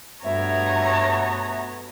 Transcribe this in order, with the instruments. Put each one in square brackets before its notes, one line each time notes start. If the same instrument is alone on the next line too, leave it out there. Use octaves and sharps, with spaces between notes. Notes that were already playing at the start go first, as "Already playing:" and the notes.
[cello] G2 [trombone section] B2 A3 B3 [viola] C#5 A#5 [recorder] E5